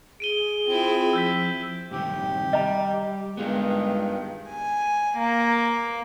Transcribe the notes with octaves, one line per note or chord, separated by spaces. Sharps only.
G#4 D7 D#7 G7
C4 E4 F4
F3 E6 G6 B6
G2 C3 D#3 G4
G3 D#5 A#5
G2 D#3 G#3 B3 F4
G#5
A#3